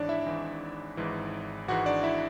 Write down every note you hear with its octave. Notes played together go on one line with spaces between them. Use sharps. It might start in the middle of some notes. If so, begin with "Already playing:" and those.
Already playing: G#1 G#2 E3 D4 C#5 D5
E4 E5
G#1 G#2 E3
G#1 G#2 E3
G#1 G#2 E3 F#4 F#5
D4 D5
E4 E5